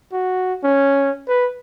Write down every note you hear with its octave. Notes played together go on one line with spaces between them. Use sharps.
F#4
C#4
B4